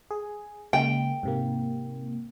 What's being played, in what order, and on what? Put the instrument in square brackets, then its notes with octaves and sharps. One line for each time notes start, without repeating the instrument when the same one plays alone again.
[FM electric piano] G#4
[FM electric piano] C#3 G#3 A#3 [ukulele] G5
[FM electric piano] G#2 C3 A#3